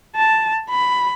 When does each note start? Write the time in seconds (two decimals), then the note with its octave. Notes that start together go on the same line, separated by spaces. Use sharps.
0.16 A5
0.70 B5